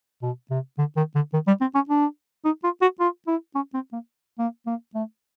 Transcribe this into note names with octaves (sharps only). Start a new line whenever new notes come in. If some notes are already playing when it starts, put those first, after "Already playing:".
B2
C3
D3
D#3
D3
D#3
G3
C4
C#4
D4
D#4
F4
F#4
F4
E4
C#4
C4
A#3
A#3
A#3
A3